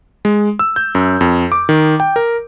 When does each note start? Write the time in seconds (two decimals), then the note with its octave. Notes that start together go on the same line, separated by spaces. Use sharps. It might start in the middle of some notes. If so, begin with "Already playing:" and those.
0.25 G#3
0.59 E6
0.76 G6
0.95 F#2
1.21 F2
1.52 D6
1.69 D#3
2.00 G5
2.16 A#4